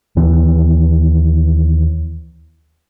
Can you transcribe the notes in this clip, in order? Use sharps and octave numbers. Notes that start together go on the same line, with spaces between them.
D#2 E3 B3